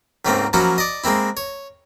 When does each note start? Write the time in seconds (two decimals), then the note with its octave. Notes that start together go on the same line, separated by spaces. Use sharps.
0.25 C#2 G#2 A3 A#3 C4
0.53 F3 F#3 A#3 C#4 E4 F#4
0.78 D5 D#5
1.04 G#3 A#3 C4 E4
1.37 C#5